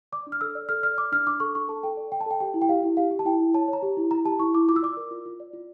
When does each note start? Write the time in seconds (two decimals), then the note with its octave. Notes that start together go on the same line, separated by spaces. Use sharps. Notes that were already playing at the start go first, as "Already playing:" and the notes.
0.12 D5 D6
0.27 D4
0.32 F6
0.41 A4 E6
0.55 D5
0.69 A4 F6
0.83 D5 F6
0.98 D5 D6
1.12 D4 F6
1.27 D4 D6
1.40 A4 C#6
1.55 D4 C#6
1.68 A4 A5
1.83 A4 G5
1.97 D5
2.12 D5 G5
2.21 A5
2.26 A4 G5
2.40 G4 G5
2.54 E4
2.62 G5
2.69 G4 F5
2.83 E4
2.97 G4 F5
3.11 G4
3.19 A5
3.25 E4 G5
3.40 E4
3.54 C#5 A5
3.68 C#5
3.73 A#5
3.82 G4
3.97 E4
4.11 E4 A#5
4.25 G4 A5
4.39 E4 C#6
4.54 E4 D6
4.68 F4 D6
4.76 E6
4.82 D5 D6
4.97 A#4
5.11 F4
5.25 F4
5.40 D5
5.53 F4